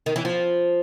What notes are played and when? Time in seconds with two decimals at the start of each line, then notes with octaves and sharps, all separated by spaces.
0.06 D#3
0.16 E3
0.25 F3